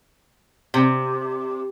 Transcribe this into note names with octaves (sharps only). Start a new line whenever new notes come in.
C3